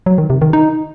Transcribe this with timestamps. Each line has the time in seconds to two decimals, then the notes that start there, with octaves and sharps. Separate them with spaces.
0.06 F#3
0.18 D#3
0.30 C3
0.42 D#3
0.53 D#4